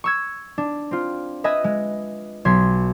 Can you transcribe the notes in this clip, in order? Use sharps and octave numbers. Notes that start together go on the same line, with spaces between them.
C#6 E6 G#6
D4
C4 F4
B4 D#5 E5 G#5
G#3
B1 C6 G#6 B6